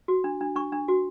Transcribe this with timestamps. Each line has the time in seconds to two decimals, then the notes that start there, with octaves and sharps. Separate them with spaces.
0.08 F#4
0.24 D4
0.41 D4
0.56 D4 C#6
0.72 D4
0.88 F#4